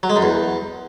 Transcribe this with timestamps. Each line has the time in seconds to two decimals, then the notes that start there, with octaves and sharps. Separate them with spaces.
0.03 F#3
0.10 G#3
0.16 F#2
0.23 E2